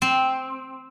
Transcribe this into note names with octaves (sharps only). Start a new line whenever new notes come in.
C4